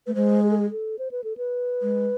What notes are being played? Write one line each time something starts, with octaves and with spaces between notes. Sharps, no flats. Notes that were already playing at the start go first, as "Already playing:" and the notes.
A3 B4
G#3 C5
G#4
A4
G#4
A4
C5
B4
A4
B4
G#3